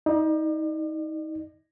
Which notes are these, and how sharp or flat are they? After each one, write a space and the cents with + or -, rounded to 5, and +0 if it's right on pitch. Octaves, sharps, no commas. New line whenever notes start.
D#4 +25 D5 +45